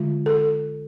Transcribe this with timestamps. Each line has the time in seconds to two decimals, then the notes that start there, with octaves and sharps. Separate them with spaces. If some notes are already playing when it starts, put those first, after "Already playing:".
Already playing: D3 G#3 F4
0.26 A4